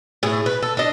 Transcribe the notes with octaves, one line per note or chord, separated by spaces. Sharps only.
A2 G#4
B4
A4
D4 D#5